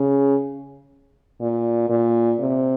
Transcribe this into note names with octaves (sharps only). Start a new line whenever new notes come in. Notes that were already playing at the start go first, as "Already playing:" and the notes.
Already playing: C#3
A#2
A#2
C3